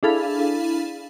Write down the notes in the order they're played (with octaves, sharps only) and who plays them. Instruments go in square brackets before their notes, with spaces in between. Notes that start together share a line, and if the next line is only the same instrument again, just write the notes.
[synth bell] D4 E4 G#4 A4 F5 B5